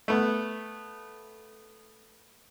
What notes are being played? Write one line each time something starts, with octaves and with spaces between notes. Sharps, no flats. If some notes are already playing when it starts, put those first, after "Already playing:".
A3 B3